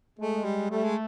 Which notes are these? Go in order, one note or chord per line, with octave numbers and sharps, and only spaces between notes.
G#3 A3
G3
G3 A3
G#3